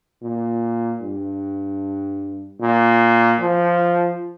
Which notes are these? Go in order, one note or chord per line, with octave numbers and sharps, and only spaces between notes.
A#2
G2
A#2
F3